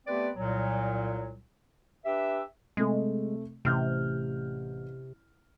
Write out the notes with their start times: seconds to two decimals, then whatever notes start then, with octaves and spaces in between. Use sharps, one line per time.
0.07 A3 B3 C4 G4 B4 D5
0.36 C2 A#2 F#3
2.05 D4 G4 B4 E5
2.77 C3 G#3 A3
3.65 A1 C3 F6 G6